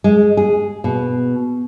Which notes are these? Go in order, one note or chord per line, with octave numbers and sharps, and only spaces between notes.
G#3
G#4
B2